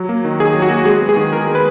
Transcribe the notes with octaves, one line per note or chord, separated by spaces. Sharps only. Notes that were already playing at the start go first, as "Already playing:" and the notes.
Already playing: F#3
A#3
D#3
D#3 G#4
F#3
F#4
A#3
G#3 G#4
B3
G#4
D#3
D#3 A#4
G#3
B4